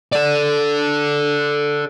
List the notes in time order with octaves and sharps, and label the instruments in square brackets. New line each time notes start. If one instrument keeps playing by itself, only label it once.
[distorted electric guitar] A4 D5